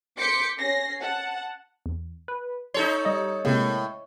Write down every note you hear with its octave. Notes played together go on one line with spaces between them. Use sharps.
C6 D6 G6 B6 C#7
C#4 A#6 C7
F#5 A5
E2
B4
D#4 A4 C#5 C6 G6
G3 D#5
A2 C3 G#3 A#3